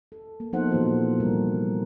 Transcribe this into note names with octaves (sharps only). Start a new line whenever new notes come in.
A4
A#3
F3 B3 D#4 A4 C5 F#5
A#2 E3 F3 A#3 F#4 C5
C3 G3 A#4